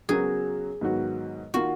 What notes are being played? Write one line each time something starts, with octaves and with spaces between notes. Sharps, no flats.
C#3 F#3 B3 F#4 G#4 A#4
G#2 D#3 F#3 B3 F#4
D#3 A#3 F4 F#4